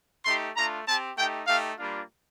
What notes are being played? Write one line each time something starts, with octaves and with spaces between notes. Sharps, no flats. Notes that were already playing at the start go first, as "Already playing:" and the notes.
A3 D#4 G4 C6
A3 D4 F4 A#5
C4 G4 A5
A3 D#4 G4 G5
A3 D#4 G4 F5
G3 A#3 D4 F4